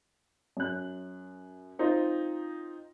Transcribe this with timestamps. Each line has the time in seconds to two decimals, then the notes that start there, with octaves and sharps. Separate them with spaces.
0.57 F#2 F#6
1.79 C4 D#4 F4 C5